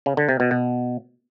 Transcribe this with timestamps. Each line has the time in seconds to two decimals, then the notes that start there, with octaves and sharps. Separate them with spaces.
0.06 C#3
0.17 D3
0.29 C3
0.40 B2
0.51 B2